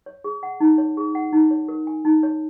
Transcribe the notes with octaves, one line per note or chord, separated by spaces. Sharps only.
C#5
G#4
F#5
D#4
C#5
G#4
F#5
D#4
C#5
A#4
G#5
D#4
C#5